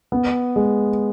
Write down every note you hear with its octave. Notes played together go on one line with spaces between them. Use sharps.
B3
G#3